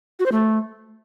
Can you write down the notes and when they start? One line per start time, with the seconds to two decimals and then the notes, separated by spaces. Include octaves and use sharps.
0.20 F#4
0.26 C5
0.32 A3